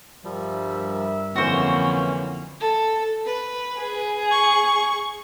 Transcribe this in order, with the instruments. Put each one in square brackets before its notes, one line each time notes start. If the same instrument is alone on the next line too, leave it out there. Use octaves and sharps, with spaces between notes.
[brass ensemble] G2 A#4 E5 [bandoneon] F3 G3
[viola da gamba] F2 D3 A#3 [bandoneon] E3 C#4 [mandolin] F#4 C5
[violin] A4
B4
[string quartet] G#4
[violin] C#6